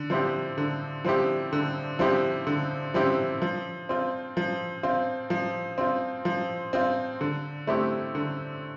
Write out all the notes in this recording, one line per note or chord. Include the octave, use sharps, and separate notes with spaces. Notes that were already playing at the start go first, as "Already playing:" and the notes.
Already playing: D3
F3 C4 E4 G4
D3
F3 C4 E4 G4
D3
F3 C4 E4 G4
D3
F3 C4 E4 G4
F3
C4 F4
F3
C4 F4
F3
C4 F4
F3
C4 F4
D3
A3 C4 E4 G4
D3